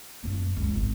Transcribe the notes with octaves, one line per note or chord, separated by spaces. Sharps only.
F#2 A#3
C#2
G#1